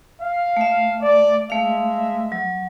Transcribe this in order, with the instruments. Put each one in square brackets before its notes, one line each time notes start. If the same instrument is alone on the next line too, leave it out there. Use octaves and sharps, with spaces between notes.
[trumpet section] F5
[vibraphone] A3 E5
[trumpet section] D5
[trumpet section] G#3 E5 [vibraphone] A3 F5
[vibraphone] F#3